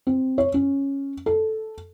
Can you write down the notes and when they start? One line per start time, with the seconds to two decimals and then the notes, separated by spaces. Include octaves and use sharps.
0.07 C4
0.38 C#5
0.54 C#4
1.26 A4